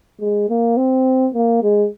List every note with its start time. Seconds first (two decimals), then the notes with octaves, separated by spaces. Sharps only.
0.20 G#3
0.49 A#3
0.77 C4
1.34 A#3
1.63 G#3